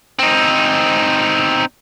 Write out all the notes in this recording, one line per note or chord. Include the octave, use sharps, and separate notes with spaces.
C4 D#4